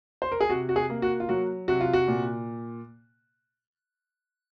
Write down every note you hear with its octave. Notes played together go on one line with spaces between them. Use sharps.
C5
A#4
G#4
C3 F#4
F#4
G#4
A#3
F#4
F4
F#3 F#4
C3 F#4
F4
F#4
A#2